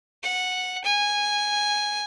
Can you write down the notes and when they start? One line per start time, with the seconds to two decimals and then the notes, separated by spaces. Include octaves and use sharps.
0.23 F#5
0.84 G#5